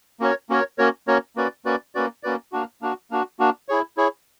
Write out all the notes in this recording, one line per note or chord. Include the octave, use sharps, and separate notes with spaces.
A#3 C#4 F#4 A#4 C#5
A#3 C#4 F#4 A#4 C#5
A#3 C#4 F#4 A#4 C#5
A#3 C#4 F#4 A#4 C#5
A#3 C#4 F#4 B4 D5
A#3 C#4 F#4 B4 D5
A#3 C#4 F#4 B4 D5
A#3 C#4 F#4 B4 D5
A#3 D4 F#4
A#3 D4 F#4
A#3 D4 F#4
A#3 D4 F#4
E4 G#4 C#5
E4 G#4 C#5